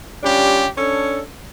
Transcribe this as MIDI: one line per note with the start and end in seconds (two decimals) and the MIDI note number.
0.23 0.68 55
0.23 0.68 61
0.23 0.68 62
0.23 0.68 65
0.23 0.68 67
0.78 1.22 61
0.78 1.22 62
0.78 1.22 69
0.78 1.22 73